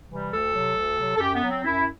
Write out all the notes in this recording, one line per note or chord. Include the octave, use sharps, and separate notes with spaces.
C3 E3 G3
D2 A4
C3 F#3
D2
C3 F#3
A4
F#2 G4
B3
F#3
C4
F#2 E4